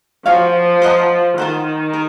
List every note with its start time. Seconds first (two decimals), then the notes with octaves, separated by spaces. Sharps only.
0.26 F3 F#4 C#5 F5 G#5
0.82 C5 D#5 F#5 A#5
1.38 D#3 F4 C5 F#5
1.93 A#4